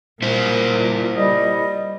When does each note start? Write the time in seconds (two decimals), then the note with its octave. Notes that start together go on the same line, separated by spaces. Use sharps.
0.22 A#2 E4 C5 E5
1.16 G3 D#5